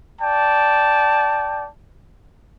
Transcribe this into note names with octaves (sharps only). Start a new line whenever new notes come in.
D5 G5 A5